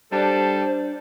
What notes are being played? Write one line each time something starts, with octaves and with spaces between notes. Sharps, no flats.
G3 D4 A4 C5